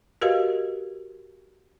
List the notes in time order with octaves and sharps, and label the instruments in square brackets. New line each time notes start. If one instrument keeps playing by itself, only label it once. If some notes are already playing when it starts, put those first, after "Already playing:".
[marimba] F#4 G4 A#4 B4 D#5 F5